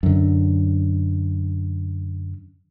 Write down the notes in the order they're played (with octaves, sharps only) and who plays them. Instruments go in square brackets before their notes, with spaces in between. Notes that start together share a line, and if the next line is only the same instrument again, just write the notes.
[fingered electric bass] F#2 D3